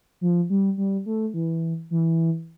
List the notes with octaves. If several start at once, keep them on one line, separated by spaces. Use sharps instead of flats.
F3
G3
G3
A3
E3
E3